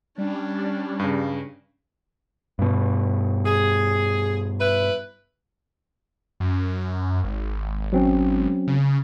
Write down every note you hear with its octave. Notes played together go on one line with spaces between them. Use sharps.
G3 C#4 D4
G2 C#3
G2 B2
G#4
E4 B4
F#2
G#1
F#3 C4 C#4
C#3